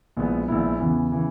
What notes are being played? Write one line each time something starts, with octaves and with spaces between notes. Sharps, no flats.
A#1 A#2 G#3 B3 E4
A#1 A#2 G#3 B3 E4
E2 C#3 E3 B3
C#3 E3 B3